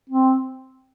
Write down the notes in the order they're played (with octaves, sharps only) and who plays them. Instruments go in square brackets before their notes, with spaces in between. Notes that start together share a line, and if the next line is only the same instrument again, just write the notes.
[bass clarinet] C4